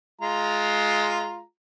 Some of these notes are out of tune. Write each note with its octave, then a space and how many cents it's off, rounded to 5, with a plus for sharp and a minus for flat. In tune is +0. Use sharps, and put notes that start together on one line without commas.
G#3 +15 F4 +0 A#5 +0